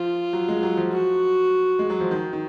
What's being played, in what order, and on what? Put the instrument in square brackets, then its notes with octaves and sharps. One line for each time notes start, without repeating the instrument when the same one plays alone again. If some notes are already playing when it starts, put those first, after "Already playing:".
Already playing: [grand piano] F3 [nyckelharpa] F4
[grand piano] F#3
G#3
F#3
F3
[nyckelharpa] F#4
[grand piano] G#3
F#3
F3
D#3
D#3